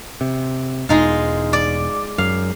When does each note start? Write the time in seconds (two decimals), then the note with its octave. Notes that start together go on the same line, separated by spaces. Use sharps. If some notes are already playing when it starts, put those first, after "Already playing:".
0.21 C3
0.89 E1 G#3 D#4 F4
1.53 D5
2.18 F#2 F5